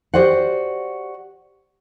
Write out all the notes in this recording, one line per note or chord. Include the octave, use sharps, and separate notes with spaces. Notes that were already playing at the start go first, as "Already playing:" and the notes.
F#4 G4 C5 D5 F#5